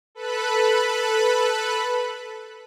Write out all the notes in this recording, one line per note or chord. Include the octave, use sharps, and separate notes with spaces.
A4 B4 B5 F#6